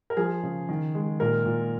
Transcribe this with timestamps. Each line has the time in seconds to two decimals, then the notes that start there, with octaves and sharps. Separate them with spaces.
0.10 A#4
0.17 F3 G#4
0.43 C#3
0.69 D#3
0.95 G#3
1.20 A#2 A#4
1.46 A#2